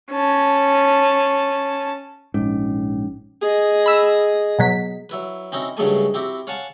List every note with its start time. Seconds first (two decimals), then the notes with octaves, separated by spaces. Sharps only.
0.12 C#4 A5
2.34 A#1 G#2 C#4
3.41 G#4 D#5
3.86 B5 E6
4.59 B2 F#3 B6
5.09 F#3 E4 B4
5.52 C4 C#4 D#4 E4 F#4
5.77 G2 C#3 F#3 G#3 A3 G#5
6.14 C4 E4 F#4 G4
6.47 C#5 F5 F#5 G#5 A5 C#6